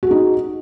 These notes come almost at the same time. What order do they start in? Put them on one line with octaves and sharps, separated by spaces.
F#4 G#4 D#4